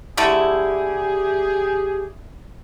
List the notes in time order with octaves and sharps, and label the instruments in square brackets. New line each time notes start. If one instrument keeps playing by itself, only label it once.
[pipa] D3 A3 E4 [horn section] G4 G#4